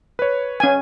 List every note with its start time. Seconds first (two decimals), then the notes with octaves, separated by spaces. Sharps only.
0.19 B4 C#5
0.60 C#4 G#5